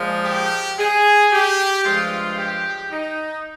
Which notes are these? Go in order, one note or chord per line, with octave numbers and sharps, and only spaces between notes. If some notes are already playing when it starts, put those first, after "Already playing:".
Already playing: A#2 F3 G#3
G4
G#4
G4
G2 F3 G#3 F4
G4
D#4